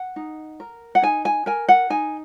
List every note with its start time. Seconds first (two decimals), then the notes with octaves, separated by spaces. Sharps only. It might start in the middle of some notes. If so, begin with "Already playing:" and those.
Already playing: F#5
0.16 D#4
0.60 A#4
0.95 F#5
1.02 D#4 G#5
1.25 G#5
1.46 A#4 G#5
1.69 F#5
1.90 D#4 G#5